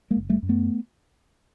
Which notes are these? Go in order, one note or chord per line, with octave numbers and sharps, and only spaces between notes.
G#3 A#3
F#1
G3 A3
F#2
A3 B3